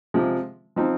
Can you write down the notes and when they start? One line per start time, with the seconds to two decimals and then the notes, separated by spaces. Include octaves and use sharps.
0.14 C3 F3 G#3
0.76 F3 C4 D#4